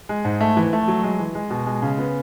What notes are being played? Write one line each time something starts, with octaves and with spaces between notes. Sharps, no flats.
G#3
G#2
A3
E3
A3
F#3
G#3
E3
G#3
B2
G#3
C#3
B3